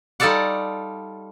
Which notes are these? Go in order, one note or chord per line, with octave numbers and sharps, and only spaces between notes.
G3 D#4 F4 A4 D5 F#5